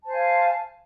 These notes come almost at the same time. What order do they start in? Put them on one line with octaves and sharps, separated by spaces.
A5 C5 G#5 F5